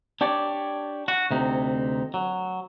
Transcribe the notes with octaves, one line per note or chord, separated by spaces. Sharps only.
D4 G4 C#5 D5
F#4
D2 C3 D#4
F#3